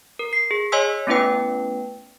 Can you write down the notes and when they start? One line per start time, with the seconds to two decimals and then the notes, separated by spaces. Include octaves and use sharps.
0.19 A#4
0.33 C7
0.51 G#4
0.72 C#5 D#5 G#5 C6 E6 B6
1.07 A3 B3 C#4 E4 B4 G5